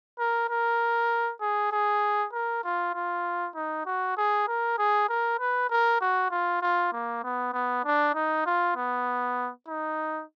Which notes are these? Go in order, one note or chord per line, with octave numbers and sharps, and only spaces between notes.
A#4
A#4
G#4
G#4
A#4
F4
F4
D#4
F#4
G#4
A#4
G#4
A#4
B4
A#4
F#4
F4
F4
A#3
B3
B3
D4
D#4
F4
B3
D#4